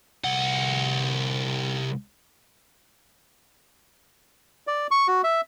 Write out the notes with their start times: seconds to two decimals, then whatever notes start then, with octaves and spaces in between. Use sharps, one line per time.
0.24 C2 F#5
4.67 D5
4.91 C#6
5.08 F#4
5.24 E5